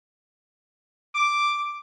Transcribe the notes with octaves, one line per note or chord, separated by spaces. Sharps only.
D6